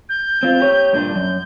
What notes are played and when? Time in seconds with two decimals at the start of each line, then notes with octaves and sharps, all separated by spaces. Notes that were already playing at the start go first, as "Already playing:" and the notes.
0.09 G6
0.43 C4 F4
0.60 G4 C#5
0.93 G2 A#2 D4 G6
1.15 F#2